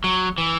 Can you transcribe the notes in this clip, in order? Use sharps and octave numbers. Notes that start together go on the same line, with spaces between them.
F#3
E3